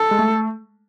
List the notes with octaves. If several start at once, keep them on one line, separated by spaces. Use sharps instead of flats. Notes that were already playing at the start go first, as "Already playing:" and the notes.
Already playing: A4
G#3
A3